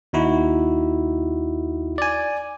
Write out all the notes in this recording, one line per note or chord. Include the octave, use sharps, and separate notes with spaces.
D#2 D#4 E4 F#4
D5 G#5